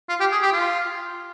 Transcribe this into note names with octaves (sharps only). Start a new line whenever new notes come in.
F4
G4
G#4
G4
F4